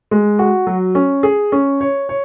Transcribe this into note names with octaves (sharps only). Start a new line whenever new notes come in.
G#3
F#4
F#3
C#4
G#4
C#4
C#5
C#5